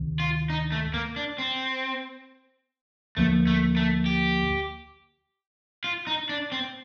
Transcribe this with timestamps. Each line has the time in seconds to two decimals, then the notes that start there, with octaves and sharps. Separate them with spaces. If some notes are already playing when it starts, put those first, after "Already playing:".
Already playing: D2 C3 D#3
0.20 F4
0.50 D#4
0.72 A3
0.94 A#3
1.16 D4
1.38 C4
3.17 D2 D3 F3 A3 A#3
3.47 A3
3.77 A3
4.06 G4
5.84 F4
6.07 D#4
6.29 D4
6.52 C4